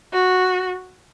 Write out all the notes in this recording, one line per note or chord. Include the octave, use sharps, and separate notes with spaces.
F#4